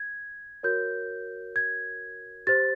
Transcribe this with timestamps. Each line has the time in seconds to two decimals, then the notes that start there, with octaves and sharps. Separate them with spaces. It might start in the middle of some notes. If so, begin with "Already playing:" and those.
Already playing: G#6
0.63 F#4 A#4 C#5 G6
1.56 G#6
2.47 G4 C5 A6